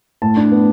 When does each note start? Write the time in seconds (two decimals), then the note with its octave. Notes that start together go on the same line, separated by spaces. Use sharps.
0.22 A2 A5
0.36 D4
0.51 B3